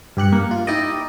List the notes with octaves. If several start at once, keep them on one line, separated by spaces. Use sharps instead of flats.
G2 G4 F#6 C#7
A#3
F4
D#4 E4 G4 D5 D#5